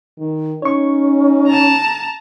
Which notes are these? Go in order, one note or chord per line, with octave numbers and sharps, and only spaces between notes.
D#3
C#4 D#4 C#5 C#6
A5 A#5